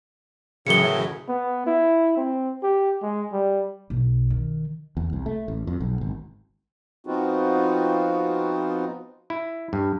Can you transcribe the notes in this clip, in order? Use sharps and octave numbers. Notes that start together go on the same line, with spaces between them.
F#2 A2 C#3 E3 F#3 G#4 C#7 G7
B3
E4
C4
G4
G#3
G3
B1
D#3
E2
C2
A3
A1
F2
B1
G#1
F3 B3 C4 D#4 F4 F#4
E4
G2